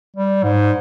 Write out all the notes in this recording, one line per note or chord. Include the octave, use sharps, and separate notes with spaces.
G3
G#2